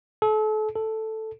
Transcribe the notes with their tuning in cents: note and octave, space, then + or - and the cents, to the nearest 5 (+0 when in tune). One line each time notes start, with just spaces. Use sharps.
A4 -35
A4 +0